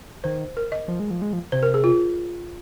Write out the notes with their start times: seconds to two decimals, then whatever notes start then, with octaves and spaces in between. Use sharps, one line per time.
0.24 D#3 C5
0.57 A#4
0.72 D#5
0.88 F3
1.00 G#3
1.11 F3
1.22 G#3
1.33 F3
1.52 C3 C5
1.63 A#4
1.74 G#4
1.84 F4